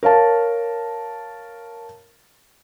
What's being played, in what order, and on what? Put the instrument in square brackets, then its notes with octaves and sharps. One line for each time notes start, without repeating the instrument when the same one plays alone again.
[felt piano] A#4 C#5 F5 A5